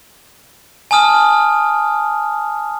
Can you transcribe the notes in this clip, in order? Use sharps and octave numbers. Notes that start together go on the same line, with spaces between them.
G#5 A5 D#6 F6